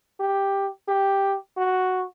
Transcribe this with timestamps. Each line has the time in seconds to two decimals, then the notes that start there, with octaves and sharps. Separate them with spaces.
0.20 G4
0.88 G4
1.57 F#4